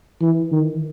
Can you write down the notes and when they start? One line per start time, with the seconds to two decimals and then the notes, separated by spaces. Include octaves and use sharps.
0.22 E3
0.52 D#3